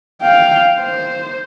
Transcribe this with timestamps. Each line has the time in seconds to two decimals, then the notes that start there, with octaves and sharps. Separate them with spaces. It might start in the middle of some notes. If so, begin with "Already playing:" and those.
0.21 F5 G5
0.80 C5